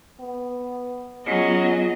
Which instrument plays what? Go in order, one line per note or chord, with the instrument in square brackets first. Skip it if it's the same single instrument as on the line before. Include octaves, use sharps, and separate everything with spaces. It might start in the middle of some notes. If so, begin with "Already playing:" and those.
[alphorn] B3
[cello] F#3 [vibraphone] B3 F4 G#4 [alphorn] C#4 [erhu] D#5